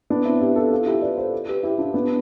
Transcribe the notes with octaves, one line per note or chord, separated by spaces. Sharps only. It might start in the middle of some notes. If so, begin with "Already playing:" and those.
B3 D4
C4 E4
E4 G4
F4 A4
F4 A4
E4 G4
B4 D5
A4 C5
G4 B4
E4 G4
D4 F4
B3 D4